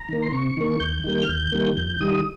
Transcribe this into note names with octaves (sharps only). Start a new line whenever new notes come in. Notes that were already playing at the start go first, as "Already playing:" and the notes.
Already playing: A#5
D#3 A#3
C6
C3 C#6
D#3 A#3
D#2 G6
D#3 G3 A#3
F6
D#2 G6
D#3 G3 A#3
F2 G6
D#3 G3 D#6